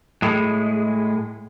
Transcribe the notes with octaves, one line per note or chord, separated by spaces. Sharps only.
A2 G#3